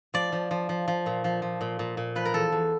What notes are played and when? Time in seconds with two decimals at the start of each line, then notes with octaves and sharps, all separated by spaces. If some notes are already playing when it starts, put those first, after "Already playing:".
0.14 F3 D5
0.32 F3
0.51 F3
0.69 F3
0.88 F3
1.06 A#2
1.24 F3
1.42 F3
1.61 A#2
1.79 A#2
1.97 A#2
2.16 F3 B4
2.25 A#4
2.34 E2 A4
2.52 E2